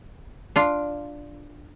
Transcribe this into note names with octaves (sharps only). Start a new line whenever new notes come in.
D4 F4